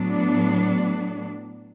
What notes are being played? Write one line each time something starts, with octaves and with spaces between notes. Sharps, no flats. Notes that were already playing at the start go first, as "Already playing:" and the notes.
Already playing: A2 F#3 B3 D4